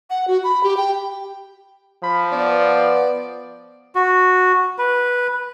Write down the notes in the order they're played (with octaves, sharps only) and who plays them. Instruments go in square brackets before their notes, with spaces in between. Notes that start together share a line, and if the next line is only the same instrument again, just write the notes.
[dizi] F#5
F#4
B5
G4
G5
[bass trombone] F3 [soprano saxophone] B5
[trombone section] B3 [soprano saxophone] D5
[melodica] F#4
B4